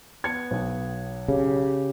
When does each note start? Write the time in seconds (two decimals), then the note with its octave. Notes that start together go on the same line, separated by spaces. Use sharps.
0.24 B3 G#6 C#7
0.51 B1
1.28 C#3 G4